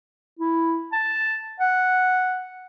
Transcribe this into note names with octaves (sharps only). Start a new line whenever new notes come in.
E4
A5
F#5